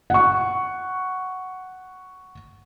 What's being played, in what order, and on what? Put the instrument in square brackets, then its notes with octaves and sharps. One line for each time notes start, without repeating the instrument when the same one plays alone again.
[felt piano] F#5 C#6